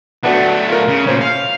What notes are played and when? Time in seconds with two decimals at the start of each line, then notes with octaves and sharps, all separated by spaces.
0.23 F#3 A3 B3 D4 F#4
0.69 F4 A#4
0.88 C#3
1.07 A#2 C#3 C#4 C5
1.21 F5